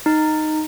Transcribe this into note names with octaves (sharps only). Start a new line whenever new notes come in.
D#4